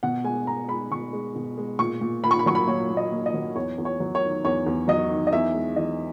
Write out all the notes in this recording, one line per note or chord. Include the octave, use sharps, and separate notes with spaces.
B2 F#5
G#3 G#5
B2 A#5
G#3 B5
B2 C#6
G#3
B2
G#3
A#2 C#6
A#2
A#3 B5
C#6
B5
F#3 C#6
B5
A#2 C#5
A#2
D#5
A#3
D#5
F#3
E2 C#5
E2
C#5
F#3
C#5
D#3
E2 C#5
E2
F#3 D#5
D#3
D#5
E2 E5
G#3
E3 D#5